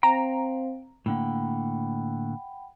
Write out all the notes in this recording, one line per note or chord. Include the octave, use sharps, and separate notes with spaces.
C4 C5 F5 G5 A#5
A2 D3 A#3 F#5 G5 B5